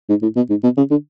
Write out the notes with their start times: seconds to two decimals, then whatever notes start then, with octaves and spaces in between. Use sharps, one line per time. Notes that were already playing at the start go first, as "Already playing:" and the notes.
0.09 G#2
0.22 A2
0.36 B2
0.50 G#2
0.63 B2
0.77 C#3
0.90 D3